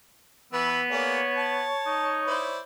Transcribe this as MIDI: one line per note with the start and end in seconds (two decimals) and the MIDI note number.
0.53 0.81 52
0.53 1.69 59
0.53 0.81 71
0.53 0.81 88
0.90 1.19 58
0.90 1.19 68
0.90 2.64 73
0.90 1.19 74
1.37 2.21 81
1.86 2.46 63
2.27 2.60 64
2.27 2.60 72
2.27 2.60 74